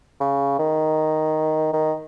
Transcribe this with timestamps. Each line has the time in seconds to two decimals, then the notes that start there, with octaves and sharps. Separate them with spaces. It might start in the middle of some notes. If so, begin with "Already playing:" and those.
0.21 C#3
0.59 D#3
1.73 D#3